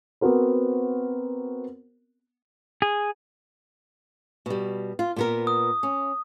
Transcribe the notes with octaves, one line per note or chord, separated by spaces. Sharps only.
B3 C4 F#4 A#4 C5
G#4
B2 G3
F4
A#2 B3 A#4
D#6
C#4